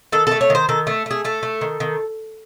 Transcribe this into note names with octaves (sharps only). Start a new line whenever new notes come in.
D#3 A4
A4
A3
C#5
D#3 C5
D#3 A4
A3
A3 G#4
A3 A4
A3
D#3
D#3